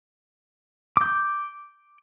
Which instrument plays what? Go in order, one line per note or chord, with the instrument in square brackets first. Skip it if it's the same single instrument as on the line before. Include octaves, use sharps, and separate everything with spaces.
[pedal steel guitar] D6 G6